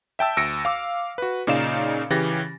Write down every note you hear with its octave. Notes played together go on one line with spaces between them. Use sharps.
E5 G5 A5 E6
D2 E6 A#6 C#7 D7
F5 D6 E6
F#4 B4
A#2 C#3 D#4 D5 F5 E7
C#3 E3 G4 A6 A#6